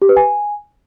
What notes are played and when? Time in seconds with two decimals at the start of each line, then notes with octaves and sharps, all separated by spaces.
0.02 G4
0.09 B4
0.17 G#5